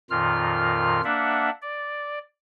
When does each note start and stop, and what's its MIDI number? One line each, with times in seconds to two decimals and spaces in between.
0.10 1.01 41
0.10 1.01 46
0.10 1.01 51
0.10 1.01 65
0.10 1.01 89
1.04 1.50 58
1.04 1.50 62
1.04 1.50 76
1.04 1.50 78
1.62 2.19 74